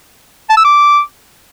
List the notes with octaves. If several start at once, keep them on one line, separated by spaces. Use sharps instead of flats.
A5
E6
D6